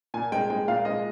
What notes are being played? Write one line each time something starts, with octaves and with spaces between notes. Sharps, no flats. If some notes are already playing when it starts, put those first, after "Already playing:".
A#2 G#5
G#3 G5
G#3 G5
A#2 F5
G#3 D#5